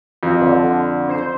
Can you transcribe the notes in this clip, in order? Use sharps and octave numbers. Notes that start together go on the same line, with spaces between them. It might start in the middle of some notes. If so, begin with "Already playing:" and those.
F2
D3
C5